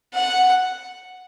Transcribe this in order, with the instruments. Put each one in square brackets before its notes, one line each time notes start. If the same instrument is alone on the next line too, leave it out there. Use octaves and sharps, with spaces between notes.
[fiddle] F#5